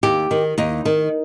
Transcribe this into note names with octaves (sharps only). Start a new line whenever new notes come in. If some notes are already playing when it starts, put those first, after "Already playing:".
D#2 G4
D#3
D#2 D#4
D#3